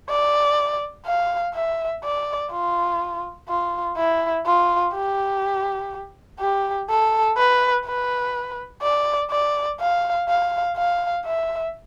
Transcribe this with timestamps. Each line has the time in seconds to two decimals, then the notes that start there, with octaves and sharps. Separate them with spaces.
0.09 D5
1.06 F5
1.54 E5
2.03 D5
2.52 F4
3.48 F4
3.97 E4
4.46 F4
4.94 G4
6.40 G4
6.89 A4
7.37 B4
7.86 B4
8.82 D5
9.31 D5
9.80 F5
10.28 F5
10.77 F5
11.25 E5